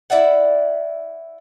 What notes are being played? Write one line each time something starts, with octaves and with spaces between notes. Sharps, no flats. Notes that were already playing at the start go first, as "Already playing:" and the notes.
E4 D5 E5 F#5